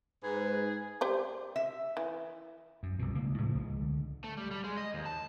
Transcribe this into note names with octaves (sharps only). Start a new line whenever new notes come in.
G#2 G#4 B4
G4 C5 D5
E5
E3
F#2
C2 F2 B2
C#2 A#3
A2 C#3 F3
C#2 C#3 F3 G#3
D3
A3
G3
G3
G#3
D#5
D#2
A5